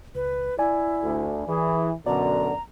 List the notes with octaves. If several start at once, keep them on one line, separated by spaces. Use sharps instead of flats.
C#2 B4
E4 D5 G#5
D2
E3 G#4
F#2 B2 D3 D5 A#5